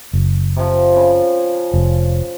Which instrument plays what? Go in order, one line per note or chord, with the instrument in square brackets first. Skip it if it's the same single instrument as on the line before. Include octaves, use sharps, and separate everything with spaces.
[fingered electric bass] F#1
[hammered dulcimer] C3 F3
C#3
[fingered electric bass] F1